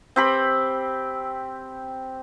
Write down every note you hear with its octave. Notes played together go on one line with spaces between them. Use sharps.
C4 G4 B5